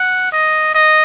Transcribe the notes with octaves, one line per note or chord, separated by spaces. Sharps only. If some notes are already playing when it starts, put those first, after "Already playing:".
Already playing: F#5
D#5
D#5